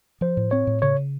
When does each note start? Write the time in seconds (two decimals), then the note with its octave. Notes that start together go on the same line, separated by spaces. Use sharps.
0.21 F3 C5
0.37 A2
0.51 C4 C#5
0.67 A2
0.82 C#3 C#5